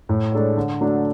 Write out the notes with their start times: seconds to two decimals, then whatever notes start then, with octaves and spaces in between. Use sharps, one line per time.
0.09 A2
0.32 G#3 D4 A4 C#5
0.57 D3
0.81 F#3 A3 D4